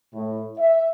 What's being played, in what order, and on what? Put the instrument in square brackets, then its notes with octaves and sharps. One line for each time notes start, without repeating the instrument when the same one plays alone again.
[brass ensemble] A2
E5